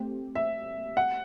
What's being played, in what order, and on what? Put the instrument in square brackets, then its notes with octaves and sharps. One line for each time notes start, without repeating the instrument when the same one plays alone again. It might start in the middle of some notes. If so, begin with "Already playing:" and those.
Already playing: [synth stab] A3 C4 G4
[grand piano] E5
F#5